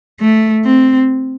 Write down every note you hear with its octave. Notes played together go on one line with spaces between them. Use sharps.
A3
C4